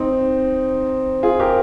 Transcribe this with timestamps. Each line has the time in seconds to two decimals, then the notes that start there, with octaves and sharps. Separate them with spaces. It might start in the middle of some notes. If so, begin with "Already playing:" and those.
Already playing: C4 D#4
1.23 F4 G#4
1.40 G4 A#4